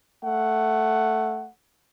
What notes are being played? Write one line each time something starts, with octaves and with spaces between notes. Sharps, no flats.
A3 F#5